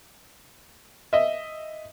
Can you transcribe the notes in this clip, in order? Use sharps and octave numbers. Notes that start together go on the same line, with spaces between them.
D#5 E5